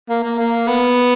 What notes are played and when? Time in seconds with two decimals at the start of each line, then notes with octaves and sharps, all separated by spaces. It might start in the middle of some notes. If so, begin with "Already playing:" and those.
0.09 A#3
0.24 A#3
0.39 A#3
0.68 B3